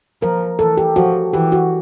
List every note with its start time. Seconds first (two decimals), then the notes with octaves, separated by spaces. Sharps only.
0.22 F3 A#4
0.59 E3 A4
0.77 G4
0.96 F3 F#4
1.33 E3 G4
1.52 F#4